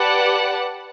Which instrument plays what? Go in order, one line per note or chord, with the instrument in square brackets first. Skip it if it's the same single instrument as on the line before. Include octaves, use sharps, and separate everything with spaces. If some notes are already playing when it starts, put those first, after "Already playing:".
Already playing: [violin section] G4 B4 D5 F#5 A5